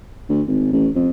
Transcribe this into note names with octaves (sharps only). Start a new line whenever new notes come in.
D2
G#1
A1
F2